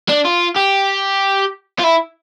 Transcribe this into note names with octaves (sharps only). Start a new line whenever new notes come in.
D4
F4
G4
F4
E4